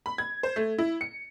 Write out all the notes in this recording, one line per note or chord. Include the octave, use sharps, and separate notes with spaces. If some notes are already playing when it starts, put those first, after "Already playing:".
B5
G#6
C5
A3
E4
C#7